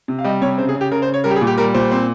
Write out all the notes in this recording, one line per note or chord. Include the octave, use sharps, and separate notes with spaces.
C3
F5
G3 D#5
C3 C#5
C#3 C5
G#4
C#3
G4
C#3 A#4
C5
C#3
C#5
G3 A#4
G4
G#4
A#2
G4
G3 A#4
A#2 C5
C4